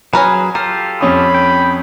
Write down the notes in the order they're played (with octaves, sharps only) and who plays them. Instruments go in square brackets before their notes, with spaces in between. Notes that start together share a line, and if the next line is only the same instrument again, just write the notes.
[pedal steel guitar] F#3 G#4 [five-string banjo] C#4 A#4 B4
[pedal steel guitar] F4 G4 A4 [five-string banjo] A#4
[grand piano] F2 C#4 D#6 [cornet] B5
[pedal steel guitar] G5